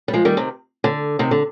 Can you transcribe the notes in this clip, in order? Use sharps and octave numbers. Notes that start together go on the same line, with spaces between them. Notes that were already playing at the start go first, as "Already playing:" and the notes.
G3
F3 G#3
D#3 G3
C3 D#3
D3
C3 D#3
D3